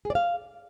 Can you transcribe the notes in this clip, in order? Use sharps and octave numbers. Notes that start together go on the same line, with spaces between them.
G#4
D5
F5